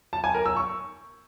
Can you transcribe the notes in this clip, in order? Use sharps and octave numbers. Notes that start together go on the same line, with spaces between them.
A5
G#5
A#4
E6
C#6